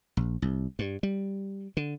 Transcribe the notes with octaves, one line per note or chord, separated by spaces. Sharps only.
A#1
C2
G2
G3
D3